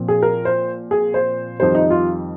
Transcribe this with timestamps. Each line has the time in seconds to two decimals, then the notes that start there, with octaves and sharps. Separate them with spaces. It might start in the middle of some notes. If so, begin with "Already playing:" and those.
Already playing: A#2 F3 C4
0.08 G#4
0.22 A#4
0.45 C5
0.91 G#4
1.14 C5
1.60 F2 D#3 G3 C5
1.75 D#4
1.90 F4